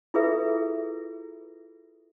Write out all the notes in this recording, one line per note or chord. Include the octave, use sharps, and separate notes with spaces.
E4 F4 G#4 A4 B4 E5